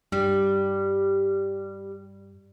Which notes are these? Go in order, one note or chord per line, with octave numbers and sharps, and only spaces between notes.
G2 G3